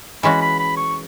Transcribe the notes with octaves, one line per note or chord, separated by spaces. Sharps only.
E3 G#3 C#4 F#4 B5
B5
B5
C#6